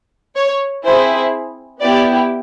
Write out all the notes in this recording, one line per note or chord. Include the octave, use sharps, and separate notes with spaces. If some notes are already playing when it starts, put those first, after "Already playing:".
C#5
C4 E4 G#4 C5
B3 E4 G4 D5